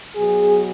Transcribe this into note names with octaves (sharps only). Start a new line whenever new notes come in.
B2 F#3 G#4